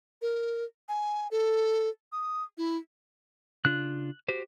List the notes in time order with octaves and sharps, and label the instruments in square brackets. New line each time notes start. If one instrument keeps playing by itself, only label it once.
[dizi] A#4
G#5
A4
D#6
E4
[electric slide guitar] C#3 D4 F4 [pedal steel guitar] F#6
[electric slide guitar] F#4 G4 C5